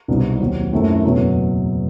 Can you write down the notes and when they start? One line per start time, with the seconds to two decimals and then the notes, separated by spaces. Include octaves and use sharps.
0.08 C2 B2 G3 C4 D#4
0.40 D#2 D#3 F#3 C4
0.72 F#2 D#3 A3 C4 E4
1.04 F#1 E2 B2 F#3 B3